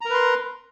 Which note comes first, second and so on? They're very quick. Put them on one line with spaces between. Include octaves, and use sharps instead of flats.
A#5 A#4 B4 C6